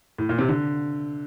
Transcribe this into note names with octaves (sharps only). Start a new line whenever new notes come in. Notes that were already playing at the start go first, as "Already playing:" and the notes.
A2
A#2
C3
D3